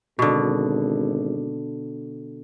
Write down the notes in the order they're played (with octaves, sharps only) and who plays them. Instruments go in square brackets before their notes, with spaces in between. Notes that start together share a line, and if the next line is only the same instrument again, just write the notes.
[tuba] G#1 [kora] B2 D3